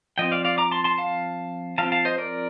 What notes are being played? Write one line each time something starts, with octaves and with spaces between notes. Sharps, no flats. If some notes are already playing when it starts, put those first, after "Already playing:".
F3 C4 D#5 G5
D5 F5
D5 F5
A#5 D6
A5 C6
A5 C6
F5 A5
F3 C4 F5 A5
F5 A5
C5 D#5
A#4 D5